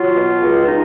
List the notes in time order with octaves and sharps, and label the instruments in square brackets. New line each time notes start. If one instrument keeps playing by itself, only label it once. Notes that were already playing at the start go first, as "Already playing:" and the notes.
Already playing: [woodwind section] F#3 F4
B2
C#2
D#4